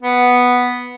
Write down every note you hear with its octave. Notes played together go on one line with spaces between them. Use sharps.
B3